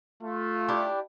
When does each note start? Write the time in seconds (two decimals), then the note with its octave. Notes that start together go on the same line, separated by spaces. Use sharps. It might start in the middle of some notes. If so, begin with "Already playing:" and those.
0.23 A3 F4
0.68 D4 E4 G4